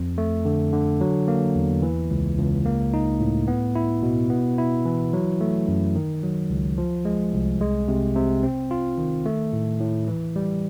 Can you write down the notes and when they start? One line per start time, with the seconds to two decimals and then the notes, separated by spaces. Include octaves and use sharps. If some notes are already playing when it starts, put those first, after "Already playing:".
Already playing: F2
0.18 A3
0.45 D3
0.73 D3
1.01 F#3
1.28 A#3
1.55 E2
1.82 E3
2.11 C#2
2.38 C#2
2.65 A#3
2.94 D#4
3.20 A2
3.48 B3
3.75 E4
4.03 B2
4.30 B3
4.58 E4
4.85 E3
5.13 F#3
5.41 A3
5.68 F#2
5.96 D#3
6.23 F#3
6.50 C#2
6.78 F3
7.05 G#3
7.33 C2
7.61 G#3
7.88 C3
8.16 C3
8.43 C4
8.71 F4
8.98 D#3
9.26 A3
9.53 A2
9.80 A2
10.08 E3
10.36 G3